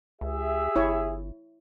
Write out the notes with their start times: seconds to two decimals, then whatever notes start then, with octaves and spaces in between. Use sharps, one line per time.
0.21 C#2 G4 G#4 E5
0.76 G1 E4 C#5